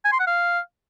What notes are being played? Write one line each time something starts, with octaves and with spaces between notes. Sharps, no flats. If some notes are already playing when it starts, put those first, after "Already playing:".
G#5
C6
F#5
F5